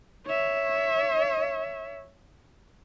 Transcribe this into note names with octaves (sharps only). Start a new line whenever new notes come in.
C#5 E5